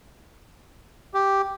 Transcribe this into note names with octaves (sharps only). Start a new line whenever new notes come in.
G4